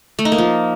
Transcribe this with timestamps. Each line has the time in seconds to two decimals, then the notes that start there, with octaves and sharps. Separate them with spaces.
0.19 A3
0.25 D#4
0.32 A#3
0.38 F3